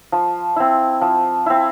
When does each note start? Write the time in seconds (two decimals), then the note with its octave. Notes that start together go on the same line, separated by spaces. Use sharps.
0.12 F3
0.56 C4 E4
1.01 F3
1.46 C4 E4